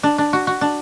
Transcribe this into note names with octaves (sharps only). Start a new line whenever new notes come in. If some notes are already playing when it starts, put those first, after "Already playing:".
D4
D4
F#4
F#4
D4